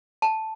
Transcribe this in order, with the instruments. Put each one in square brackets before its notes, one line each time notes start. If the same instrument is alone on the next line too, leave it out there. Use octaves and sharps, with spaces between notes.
[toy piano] A5